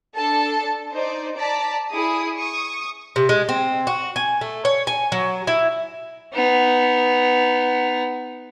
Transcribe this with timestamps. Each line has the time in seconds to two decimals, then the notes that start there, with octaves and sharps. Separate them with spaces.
0.15 D4 A4 A5
0.91 D#4 C5 D5
1.36 D5 A5 A#5 B6
1.91 E4 G#4 D#6
2.37 C#6 D#6
3.16 C3
3.29 G#3
3.49 C4
3.87 F#4
4.16 G#5
4.41 A3
4.65 C#5
4.87 G#5
5.12 F#3
5.47 E4
6.33 B3 D#4